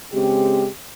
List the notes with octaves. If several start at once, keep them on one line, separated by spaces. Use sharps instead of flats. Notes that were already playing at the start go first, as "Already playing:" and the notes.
C#3 G#3 C4 G4